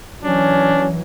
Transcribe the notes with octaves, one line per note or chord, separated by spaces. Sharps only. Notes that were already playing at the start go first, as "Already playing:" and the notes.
E3 F#3 C#4 D4